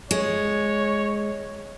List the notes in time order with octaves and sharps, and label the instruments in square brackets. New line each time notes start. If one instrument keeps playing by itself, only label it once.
[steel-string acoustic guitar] G#3 [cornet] C#5